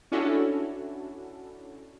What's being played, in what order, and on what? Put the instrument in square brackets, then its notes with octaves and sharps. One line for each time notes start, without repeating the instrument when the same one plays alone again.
[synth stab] C#4 D4 E4 F#4 A4